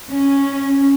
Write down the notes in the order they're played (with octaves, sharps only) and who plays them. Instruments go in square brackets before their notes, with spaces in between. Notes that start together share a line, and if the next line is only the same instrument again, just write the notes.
[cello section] C#4